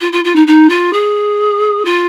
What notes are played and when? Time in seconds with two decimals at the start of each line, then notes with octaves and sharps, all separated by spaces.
0.01 F4
0.12 F4
0.24 F4
0.35 D#4
0.47 D#4
0.69 F4
0.93 G#4
1.85 F4